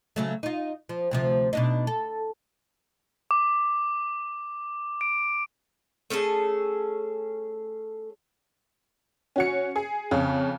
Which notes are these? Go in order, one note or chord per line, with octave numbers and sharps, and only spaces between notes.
C#3 F#3 A3
D#4 F4
F3
D2 C3 F3
B2 D4 D#4
A4
D6
D7
A3 C#4 G#4 A4
C#4 F#4 C#7
G#4
F2 C#3